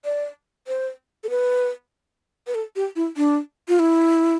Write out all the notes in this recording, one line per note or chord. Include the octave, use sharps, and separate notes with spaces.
D5
C5
A4
B4
B4
A4
G4
E4
D4
F4
E4